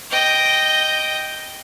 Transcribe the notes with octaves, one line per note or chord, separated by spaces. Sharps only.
D#5 G5